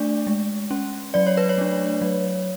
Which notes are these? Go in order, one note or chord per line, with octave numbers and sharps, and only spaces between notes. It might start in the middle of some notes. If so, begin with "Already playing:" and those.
Already playing: A3 D4 D5
G#3
C#4
F#3 D5
C#5
B4
C#5
A3 D4
F#3